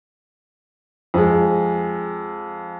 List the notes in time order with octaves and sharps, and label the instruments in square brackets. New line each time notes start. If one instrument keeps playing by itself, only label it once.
[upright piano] F2 G#3